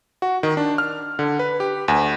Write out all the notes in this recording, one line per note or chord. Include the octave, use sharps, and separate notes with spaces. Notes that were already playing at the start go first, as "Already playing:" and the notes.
F#4
D#3
D4
F6
D3
B4
G4
D2